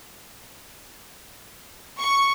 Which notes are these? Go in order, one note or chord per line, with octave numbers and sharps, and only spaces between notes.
C#6